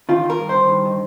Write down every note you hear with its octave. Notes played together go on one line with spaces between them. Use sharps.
D#3 F4
D#3
A#4
G2
C5
D#3
G2
D#3